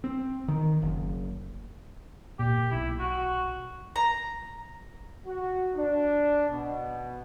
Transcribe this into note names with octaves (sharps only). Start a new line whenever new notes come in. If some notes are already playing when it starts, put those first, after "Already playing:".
C4
D#3
F#1
A#2 G4
B1 E4
F#4
A#5
F#4
D4
B2